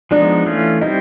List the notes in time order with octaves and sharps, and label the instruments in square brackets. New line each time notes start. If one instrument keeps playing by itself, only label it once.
[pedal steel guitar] F3 G#3 B3 D#4 [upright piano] D4
[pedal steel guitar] E3 A3 C#4 F4
[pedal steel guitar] G3 C4 E4 [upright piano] D#4